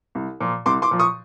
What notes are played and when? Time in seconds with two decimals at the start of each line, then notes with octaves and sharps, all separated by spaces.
0.15 C2
0.40 A#2 F3
0.66 C2 C6 D6
0.82 C6 D6
0.91 A#2 F3
0.99 C#6 D#6